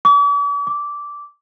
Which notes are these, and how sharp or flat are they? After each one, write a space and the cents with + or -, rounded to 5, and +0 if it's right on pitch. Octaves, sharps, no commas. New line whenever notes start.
D6 -45
D6 -10